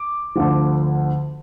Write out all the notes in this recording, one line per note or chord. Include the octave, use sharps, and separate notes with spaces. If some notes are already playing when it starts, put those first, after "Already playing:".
Already playing: D6
D2 D3 F3